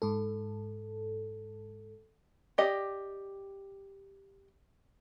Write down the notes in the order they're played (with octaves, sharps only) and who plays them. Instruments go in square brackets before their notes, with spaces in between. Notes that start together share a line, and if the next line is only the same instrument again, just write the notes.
[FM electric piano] G#2 A4
[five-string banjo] G4 D5 D#5